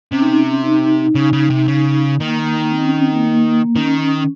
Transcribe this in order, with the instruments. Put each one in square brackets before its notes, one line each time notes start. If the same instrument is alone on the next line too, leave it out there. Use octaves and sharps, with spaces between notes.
[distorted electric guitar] C3 [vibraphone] C#4
[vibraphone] D#4
C#4
D#4
[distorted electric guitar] C#3
C#3
C3
C#3
[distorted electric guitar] D#3 [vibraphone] A#3
[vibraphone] C4
C#4
C4
A#3
A#3
[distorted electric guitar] D#3 [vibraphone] C#4